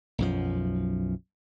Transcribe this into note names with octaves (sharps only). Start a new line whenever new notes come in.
B1 F#2 F3